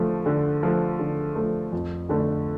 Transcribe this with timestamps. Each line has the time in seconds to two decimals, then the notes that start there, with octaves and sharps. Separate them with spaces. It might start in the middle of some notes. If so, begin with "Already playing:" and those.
Already playing: D3 F3 A3
0.26 D3
0.63 F3 A3
0.99 D3
1.35 F3 A3
1.72 F2
2.09 D3 A3